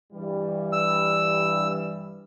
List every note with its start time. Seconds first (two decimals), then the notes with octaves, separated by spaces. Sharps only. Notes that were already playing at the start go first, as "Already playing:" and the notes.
0.13 G2 E3 G3
0.73 E6